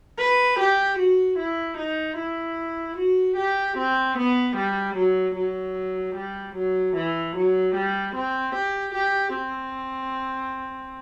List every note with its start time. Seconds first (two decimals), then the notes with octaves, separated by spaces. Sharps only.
0.19 B4
0.59 G4
0.98 F#4
1.39 E4
1.78 D#4
2.18 E4
2.98 F#4
3.37 G4
3.78 C4
4.17 B3
4.57 G3
4.97 F#3
5.37 F#3
6.17 G3
6.56 F#3
6.96 E3
7.36 F#3
7.76 G3
8.15 C4
8.55 G4
8.95 G4
9.35 C4